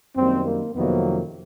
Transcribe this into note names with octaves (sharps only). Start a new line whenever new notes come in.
F#2 D#3 G3 A#3 C4
A#3
F2 C3 D#3 F#3 A#3 B3